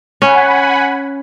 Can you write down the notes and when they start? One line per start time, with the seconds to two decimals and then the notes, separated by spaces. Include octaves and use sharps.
0.22 C#4 F#5 G#5 B5